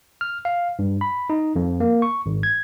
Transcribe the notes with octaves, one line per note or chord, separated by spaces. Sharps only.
F6
F5
G2
B5
D#4
F2
A#3
C#6
G#1
G#6